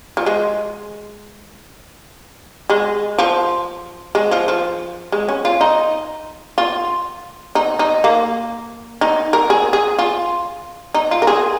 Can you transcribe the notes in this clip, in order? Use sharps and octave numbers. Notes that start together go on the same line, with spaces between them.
F3
G#3
G#3
F3
G#3
F3
F3
G#3
C#4
F4
D#4
F4
D#4
D#4
A#3
D#4
A#4
G#4
G#4
F4
D#4
F4
A#4
G#4